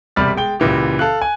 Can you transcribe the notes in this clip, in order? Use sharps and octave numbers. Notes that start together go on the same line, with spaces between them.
E1 C3 G3 B5 F6 A6
G#3 G5 G7
C#2 A#2 E3 G4
A4 F5 F#6
G#5